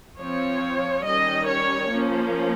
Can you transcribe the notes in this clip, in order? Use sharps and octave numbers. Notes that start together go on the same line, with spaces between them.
F3 C4 C#5
D#3 G3 C#4 D#5
C#5
F3 A#3 C#4